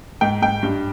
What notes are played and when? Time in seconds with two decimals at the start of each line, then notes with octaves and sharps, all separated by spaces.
0.21 G#2 G5
0.42 G#2 G5
0.63 G2